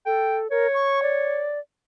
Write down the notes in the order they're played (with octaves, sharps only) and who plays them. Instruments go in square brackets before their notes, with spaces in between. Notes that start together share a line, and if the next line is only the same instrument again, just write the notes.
[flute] A4 [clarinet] G5
[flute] A#4 [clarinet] C#5
[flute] C#6
D5